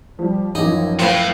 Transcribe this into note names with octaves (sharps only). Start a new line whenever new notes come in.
F3 G3
A1 F#2 F3 D#4
A2 F4 B4 G5